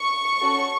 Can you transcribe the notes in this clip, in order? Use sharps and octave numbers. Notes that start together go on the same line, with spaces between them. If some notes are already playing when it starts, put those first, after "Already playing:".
Already playing: C#6
C#4 F#4 A4